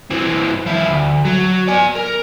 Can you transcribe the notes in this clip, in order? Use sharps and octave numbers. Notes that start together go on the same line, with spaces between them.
E3 C4
F3 E4
D2
F#3
D5 G#5
A#4